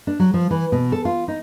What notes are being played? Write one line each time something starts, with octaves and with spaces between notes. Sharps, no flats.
D4
F#3
F3
E3
B2
A4
F4
D#4